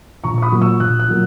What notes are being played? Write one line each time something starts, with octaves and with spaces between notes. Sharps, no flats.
A#1 A#5 C#6
C#6
B5 D#6
A#2 F#3 A#3
C#6 E6
A#1 F#6
F#6
A#2 F#3 A#3